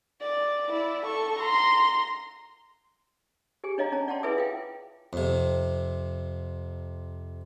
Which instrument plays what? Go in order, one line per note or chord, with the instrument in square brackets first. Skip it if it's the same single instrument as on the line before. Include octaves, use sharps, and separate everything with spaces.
[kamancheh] D5
E4 D5
A4 C#6
A#5 C6
[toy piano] G4 G#4 G#5
D4 C#5 D#5 F5 A#5
C#4 A5 A#5
D5 F#5 G5 A5 C6
E4 G#4 B4 E5 G#5 D#6
F4 F5 G5
[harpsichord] F2 C3